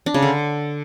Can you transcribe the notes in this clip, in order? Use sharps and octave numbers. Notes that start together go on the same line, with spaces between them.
D4
C#3
D3